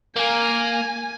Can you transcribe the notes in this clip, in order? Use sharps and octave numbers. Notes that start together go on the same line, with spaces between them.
A#3 G#5